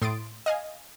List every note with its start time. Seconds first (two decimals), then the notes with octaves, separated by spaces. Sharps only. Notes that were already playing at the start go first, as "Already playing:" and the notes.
0.02 A2 C6 D#6 A6 D7
0.46 D#5 F5 G#5